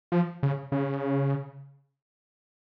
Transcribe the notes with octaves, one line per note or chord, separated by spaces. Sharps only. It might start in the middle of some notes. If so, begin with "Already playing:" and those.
F3
C#3
C#3